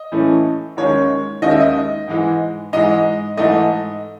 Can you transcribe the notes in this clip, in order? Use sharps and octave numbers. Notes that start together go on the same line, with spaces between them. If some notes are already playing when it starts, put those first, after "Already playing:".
Already playing: D#5
A2 E3 A3 C#4
D#2 D#3 G#3 C#4 C#5
D#2 D#3 G#3 C#4 D#5
E5
D#5
G#2 E3 G#3
G#2 E3 G#3 D#5
G#2 E3 A3 D#5